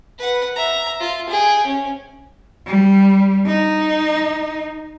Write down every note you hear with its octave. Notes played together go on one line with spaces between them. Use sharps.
B4 F#5
E5 A#5
F4
G#4 G5
C#4
G3
D#4